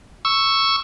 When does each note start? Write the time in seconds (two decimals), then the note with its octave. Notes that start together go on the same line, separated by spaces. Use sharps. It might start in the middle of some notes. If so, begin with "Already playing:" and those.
0.25 C#6 E6